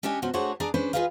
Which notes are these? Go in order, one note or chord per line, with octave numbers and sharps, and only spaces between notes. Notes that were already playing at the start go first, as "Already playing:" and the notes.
C#4 D4 G4 C#5 D#5 G#5
B2 F#3 C#4 F#4 C5
A3 D4 F#4 G#4 C5 C#5
D4 G#4 D5 G#5 A#5
C#4 D4 B4 C5
F4 G4 G#4 B4 D#5 F5